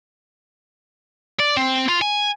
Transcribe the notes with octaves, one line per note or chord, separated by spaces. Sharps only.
D5
C4
F4
G#5